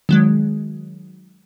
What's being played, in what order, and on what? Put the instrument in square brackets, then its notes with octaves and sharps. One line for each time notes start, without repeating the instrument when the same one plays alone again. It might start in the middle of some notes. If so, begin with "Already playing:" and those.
[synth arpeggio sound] D#3 F#3 G#3